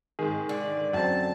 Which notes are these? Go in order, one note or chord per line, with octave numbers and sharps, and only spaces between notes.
G#2 D#3 G#4
D3 D5
F#2 C4 A5